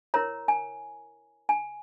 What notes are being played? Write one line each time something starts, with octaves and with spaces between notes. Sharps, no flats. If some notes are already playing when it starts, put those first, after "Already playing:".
E4 A#4 C#5 A#5
G#5
G#5